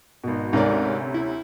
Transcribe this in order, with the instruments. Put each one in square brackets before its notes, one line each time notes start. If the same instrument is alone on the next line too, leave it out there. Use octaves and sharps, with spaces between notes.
[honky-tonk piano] G#1 B2
[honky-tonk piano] D2 C3 C#4 [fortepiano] G#2 A#4 D5
[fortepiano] E4